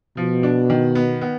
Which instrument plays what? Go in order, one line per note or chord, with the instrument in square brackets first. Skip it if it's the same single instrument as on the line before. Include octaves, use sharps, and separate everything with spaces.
[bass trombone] B2 [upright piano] F3
[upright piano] D4
D#3
B3
B3